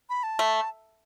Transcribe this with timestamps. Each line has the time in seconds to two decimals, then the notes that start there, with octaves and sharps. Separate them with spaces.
0.09 B5
0.23 A5
0.39 A3